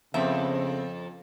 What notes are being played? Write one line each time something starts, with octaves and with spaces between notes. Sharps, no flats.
F2 C#3 B3 C4 E5